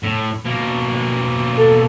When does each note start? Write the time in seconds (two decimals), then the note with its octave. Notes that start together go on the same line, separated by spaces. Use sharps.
0.03 A2
0.45 B2 A#3
1.57 A4